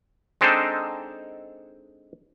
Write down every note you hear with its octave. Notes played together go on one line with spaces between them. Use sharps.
G#3 C4 D4 D#4 A4 C5